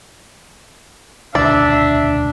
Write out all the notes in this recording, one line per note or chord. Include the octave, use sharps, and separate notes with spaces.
E1 D2 D4 D5 E5